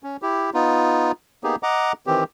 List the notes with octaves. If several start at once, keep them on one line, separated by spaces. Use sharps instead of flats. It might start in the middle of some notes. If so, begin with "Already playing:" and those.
C#4
E4 G4
B3 D#4 F4
A#3 B3 D#4 G4 G#4
D#5 F#5 A#5 D6
D#3 E3 C4 G4